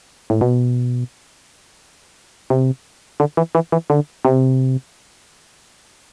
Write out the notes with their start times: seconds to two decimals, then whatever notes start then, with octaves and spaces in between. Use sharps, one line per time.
0.30 A2
0.41 B2
2.50 C3
3.20 D3
3.37 E3
3.55 E3
3.72 E3
3.90 D3
4.25 C3